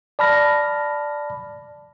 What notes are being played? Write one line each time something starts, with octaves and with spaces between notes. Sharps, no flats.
D5 A5 B5 F6 A#6